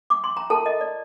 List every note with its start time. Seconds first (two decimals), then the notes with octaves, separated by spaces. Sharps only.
0.10 D6
0.24 C6
0.37 A#5
0.50 F4 A4 A#4 A5
0.66 D#5
0.81 D5